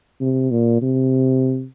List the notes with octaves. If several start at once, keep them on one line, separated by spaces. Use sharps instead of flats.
C3
A#2
C3